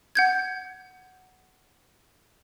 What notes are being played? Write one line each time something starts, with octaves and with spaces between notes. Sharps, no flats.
F#5 G6 G#6